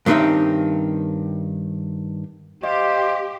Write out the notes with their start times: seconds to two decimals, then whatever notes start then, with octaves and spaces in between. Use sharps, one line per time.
0.06 G2 D#3 C4 C#4 D#4 E5
2.63 G4 C5 D#5 F5